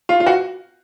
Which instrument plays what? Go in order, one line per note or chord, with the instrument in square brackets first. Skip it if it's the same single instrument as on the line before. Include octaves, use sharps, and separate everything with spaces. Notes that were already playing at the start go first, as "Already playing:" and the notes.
[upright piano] F4
F4
F#4